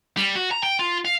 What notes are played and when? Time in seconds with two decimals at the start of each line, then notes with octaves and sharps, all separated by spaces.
0.17 G3
0.35 F#4
0.51 A#5
0.63 G5
0.79 F4
1.05 F5